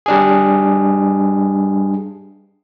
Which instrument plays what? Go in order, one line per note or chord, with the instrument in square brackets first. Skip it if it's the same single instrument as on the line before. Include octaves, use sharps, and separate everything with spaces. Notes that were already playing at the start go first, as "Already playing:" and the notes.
[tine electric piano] G3 D4 G#4